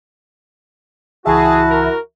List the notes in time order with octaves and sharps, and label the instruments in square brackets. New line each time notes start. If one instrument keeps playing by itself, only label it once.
[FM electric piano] C#2 E3 E5 [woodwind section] E4 F#4 [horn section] G#4 [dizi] A5
[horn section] A#4